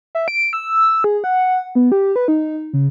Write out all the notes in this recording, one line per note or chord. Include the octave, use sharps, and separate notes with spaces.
E5
D7
E6
G#4
F#5
B3
G4
B4
D#4
C#3